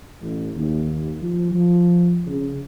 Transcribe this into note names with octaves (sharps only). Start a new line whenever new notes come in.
A1
D#2
F3
F3
C#3